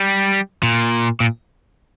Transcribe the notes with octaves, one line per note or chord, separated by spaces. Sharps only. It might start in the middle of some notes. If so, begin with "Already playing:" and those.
Already playing: G3
A#2
A#2